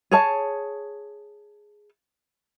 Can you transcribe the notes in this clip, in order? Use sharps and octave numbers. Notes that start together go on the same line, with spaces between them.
G#4 C#5 A5